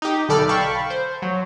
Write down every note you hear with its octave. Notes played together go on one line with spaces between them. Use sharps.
D#4 G4
B1 D3 A4 D5 B5 F6
F5 G5 A5 B5 C#6
C5
F#3